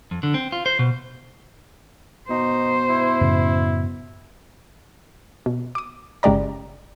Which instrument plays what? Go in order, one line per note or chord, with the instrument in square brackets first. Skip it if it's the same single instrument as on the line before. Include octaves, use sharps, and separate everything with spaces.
[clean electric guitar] F2
D3
C4
F4
C5
B2
[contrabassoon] B2 [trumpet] D#4 [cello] C5
[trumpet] E4
[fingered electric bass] F#2 A2 C#3
[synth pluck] B2
D6 D#6
G1 C#3 G#3 G4 D5 A#5